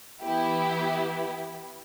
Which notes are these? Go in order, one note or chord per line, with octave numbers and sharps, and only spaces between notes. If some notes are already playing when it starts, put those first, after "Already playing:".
E3 B3 E4 G4